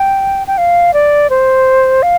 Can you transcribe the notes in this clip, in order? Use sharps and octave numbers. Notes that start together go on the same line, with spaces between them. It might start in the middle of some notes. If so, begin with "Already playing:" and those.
Already playing: G5
G5
F5
D5
C5
F5